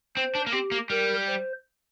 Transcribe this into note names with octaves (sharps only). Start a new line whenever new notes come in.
C4 C5
D4
A#3
C4 G4
A#3
G3 A#4
C5